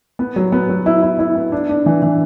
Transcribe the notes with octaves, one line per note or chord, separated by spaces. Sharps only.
B3
F#3
B3
F#3
E4
E4
E4
B3
D4
D4
E3
E3